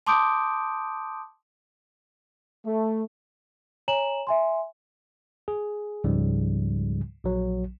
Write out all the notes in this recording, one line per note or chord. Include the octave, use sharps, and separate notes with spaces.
A5 C6 D6 D#6 G6 D7
A3
C#5 G#5 A#5 E7 F#7
E5 G#5 C6
G#4
C#2 G#2 C#3 F3 G3
A#1 F#3